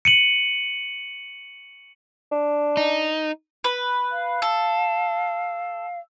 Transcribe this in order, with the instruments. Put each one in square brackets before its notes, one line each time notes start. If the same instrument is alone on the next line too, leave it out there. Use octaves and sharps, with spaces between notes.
[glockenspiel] C#7 D#7 F#7
[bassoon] D4
[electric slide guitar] D#4
[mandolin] B4
[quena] F5
[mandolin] A4